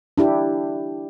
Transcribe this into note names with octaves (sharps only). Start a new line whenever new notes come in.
D4 E4 G4